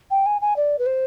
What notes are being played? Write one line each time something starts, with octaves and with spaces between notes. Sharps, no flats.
G5
G#5
G#5
D5
B4
C5